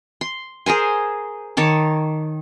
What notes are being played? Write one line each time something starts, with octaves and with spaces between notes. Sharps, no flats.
C6
G#4 A#4 C5 G#5
D#3 C#5 A5 D6